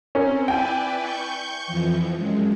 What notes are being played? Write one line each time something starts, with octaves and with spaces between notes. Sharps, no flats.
C4 C#4 A#4
E4 B4 D5 G5 G#5
C#6 G6
F2 E3 F3
F#2 G#3